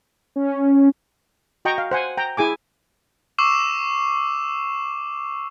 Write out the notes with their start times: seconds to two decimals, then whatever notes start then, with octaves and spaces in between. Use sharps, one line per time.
0.36 C#4
1.65 F#4 D#5 G5 A#5 C#6
1.78 F5
1.91 C5 F#5 G#5
2.17 G5 A#5
2.37 E4 G#4 G#5 D6
3.38 C#6 D6 E6 C7 E7